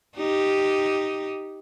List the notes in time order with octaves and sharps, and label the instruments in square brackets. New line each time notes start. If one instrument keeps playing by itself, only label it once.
[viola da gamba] D#4 G4